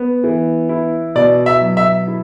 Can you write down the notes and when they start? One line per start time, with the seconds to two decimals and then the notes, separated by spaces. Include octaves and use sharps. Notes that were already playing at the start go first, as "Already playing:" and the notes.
Already playing: B3
0.24 E3
0.69 E4
1.15 B2 D5
1.46 E5
1.61 F#3
1.77 E5
2.08 E4